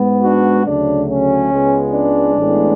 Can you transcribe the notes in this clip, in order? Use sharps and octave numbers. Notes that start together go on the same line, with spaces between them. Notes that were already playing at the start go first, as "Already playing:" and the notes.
Already playing: G#2 G#3 B3
D4 F#4
D2 C#3 F#3 A3 D4
C#4
C#2 C#3 G#3 B3
D4
A1 A2 G#3 B3